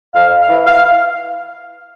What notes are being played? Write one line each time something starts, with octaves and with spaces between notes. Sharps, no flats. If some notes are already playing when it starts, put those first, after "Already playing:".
F2 F5
F5
E3
F5